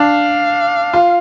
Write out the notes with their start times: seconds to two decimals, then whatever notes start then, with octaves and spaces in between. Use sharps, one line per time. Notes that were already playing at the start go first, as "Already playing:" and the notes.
Already playing: D4 F5
0.93 F4